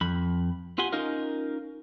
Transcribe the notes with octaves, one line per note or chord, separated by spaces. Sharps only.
F2 B5
F4 G4 F#5 G#5 C6
C#4 D#4 F4 A#4 D#5 F5